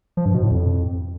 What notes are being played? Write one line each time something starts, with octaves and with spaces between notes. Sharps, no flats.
F3
G2
B2
A2
F2